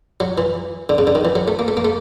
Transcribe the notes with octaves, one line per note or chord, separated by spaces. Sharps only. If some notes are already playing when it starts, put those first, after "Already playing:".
F#3
E3
D3
C#3
D3
D#3
E3
F#3
A3
A#3
A3
A#3
A3